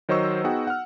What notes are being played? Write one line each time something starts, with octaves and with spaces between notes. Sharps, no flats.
D#3 F#3 C5 D#5 C#6 E6
B3 D#4 F#4 G#4 F#5 G5
F#5 F6